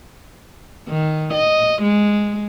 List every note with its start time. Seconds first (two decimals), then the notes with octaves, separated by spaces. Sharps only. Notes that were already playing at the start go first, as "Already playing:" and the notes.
0.89 D#3
1.33 D#5
1.82 G#3